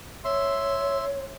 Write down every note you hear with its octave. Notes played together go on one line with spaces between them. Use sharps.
C#5 E5 C6